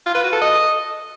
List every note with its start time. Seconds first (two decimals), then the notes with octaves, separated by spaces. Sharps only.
0.06 F4
0.15 B4
0.24 F#4
0.33 A4
0.41 D#5